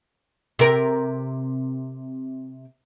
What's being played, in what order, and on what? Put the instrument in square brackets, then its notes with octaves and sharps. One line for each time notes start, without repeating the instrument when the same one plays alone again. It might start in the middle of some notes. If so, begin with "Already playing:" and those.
[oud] C3 A#4